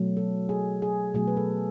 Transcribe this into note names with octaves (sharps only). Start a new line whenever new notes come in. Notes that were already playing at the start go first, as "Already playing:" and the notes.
Already playing: B2 F#3 A3
A4
G#4
G#4
B2 F#3 A3 G#4
B4
A4